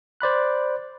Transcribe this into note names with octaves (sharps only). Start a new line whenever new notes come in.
C5 D5 B5 F#6